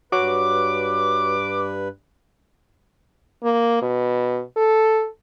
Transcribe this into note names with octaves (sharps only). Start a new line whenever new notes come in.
G2 F#4 B4 C#5 D6 F#6
A#3
B2
A4